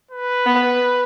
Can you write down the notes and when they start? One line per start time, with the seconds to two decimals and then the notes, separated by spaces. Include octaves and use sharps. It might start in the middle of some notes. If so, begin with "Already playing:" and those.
0.11 B4
0.46 B3